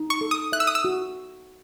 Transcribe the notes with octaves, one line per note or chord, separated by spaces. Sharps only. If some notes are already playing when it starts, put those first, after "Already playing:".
Already playing: D#4
C#6
A4
D#6
E5 F#6
E6
D#6
E6
F#4